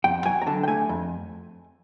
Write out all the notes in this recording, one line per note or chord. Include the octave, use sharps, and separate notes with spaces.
F2 G5
F#3 G#5
A#5
D3 A5
G5
A3 G#5
F2